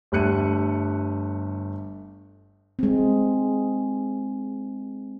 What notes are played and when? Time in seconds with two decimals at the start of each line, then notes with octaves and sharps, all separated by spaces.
0.12 G1 G3 A3 F#6 C#7 D#7
2.79 G#3 C4